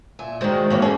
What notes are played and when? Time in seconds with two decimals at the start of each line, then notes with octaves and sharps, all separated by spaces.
0.19 A#2 E5 G#5
0.41 D#3 G#3 F#4 C5 D5
0.70 E3 A#3 C#5
0.82 C#4 G#4 A4